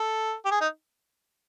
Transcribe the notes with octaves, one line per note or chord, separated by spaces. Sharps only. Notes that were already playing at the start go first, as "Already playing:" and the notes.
Already playing: A4
G4
G#4
D#4